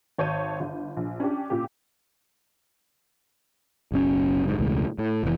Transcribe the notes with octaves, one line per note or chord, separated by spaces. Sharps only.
G#1 C#5 A5 G6 D#7
G1
A#1
C#4 D4 G4
A#2 C#3 G4
F#1 B1 C#4
F#1 G#2
E1 C#2 A2
A2
F1 A#2 E3